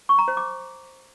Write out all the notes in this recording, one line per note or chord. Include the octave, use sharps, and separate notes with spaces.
C#6
A#5
C5
D6